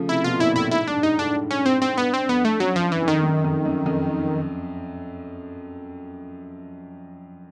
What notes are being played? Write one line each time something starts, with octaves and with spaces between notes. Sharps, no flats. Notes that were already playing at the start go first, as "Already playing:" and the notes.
Already playing: C#3 F3 A3
C3 E4
B2 F4
A#2 E4
A2 E4
G#2 E4
G2 D4
G#2 D#4
A2 D4
A2
C#4
G#2 C4
C4
G2 B3
C4
F2 B3
A3
F#2 F#3
F3
G2
E3
F2
D#3
F#2
F2
F#2
F2